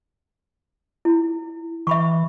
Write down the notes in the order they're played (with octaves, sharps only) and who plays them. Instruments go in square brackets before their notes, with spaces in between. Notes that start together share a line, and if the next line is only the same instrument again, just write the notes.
[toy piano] E4
[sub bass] E3 [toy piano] E5 B5 C#6